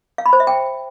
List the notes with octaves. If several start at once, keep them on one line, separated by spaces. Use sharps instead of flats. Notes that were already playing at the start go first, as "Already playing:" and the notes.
F5
B5
C5
E5
G5